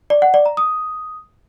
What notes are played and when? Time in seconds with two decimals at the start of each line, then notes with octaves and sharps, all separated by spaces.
0.10 D5
0.22 F#5
0.34 D5
0.46 A#5
0.57 D#6